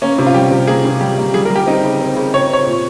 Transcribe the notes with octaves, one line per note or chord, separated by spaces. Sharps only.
A#3 C#4
C3
F4
G3 G4
C3
A#3 G#4
C3
G3 G4
A#3
G3 G#4
A#4
G3
G4
C4 D#4
C#3
C4
C#3
C#3 C#5
C4 C#5
A#2